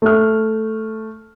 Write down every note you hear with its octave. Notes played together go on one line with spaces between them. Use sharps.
A3 F6